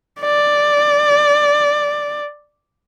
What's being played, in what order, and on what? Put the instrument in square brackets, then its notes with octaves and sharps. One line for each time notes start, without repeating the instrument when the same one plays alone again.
[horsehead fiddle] D5